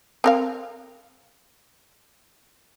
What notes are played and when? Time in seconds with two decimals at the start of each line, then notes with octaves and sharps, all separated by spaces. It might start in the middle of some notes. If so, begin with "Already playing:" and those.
0.24 C4 A#4 F5